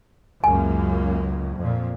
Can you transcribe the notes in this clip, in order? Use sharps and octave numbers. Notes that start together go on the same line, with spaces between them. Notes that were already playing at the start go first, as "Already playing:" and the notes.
C#2 F#2 A#3 G#5
F2 A#2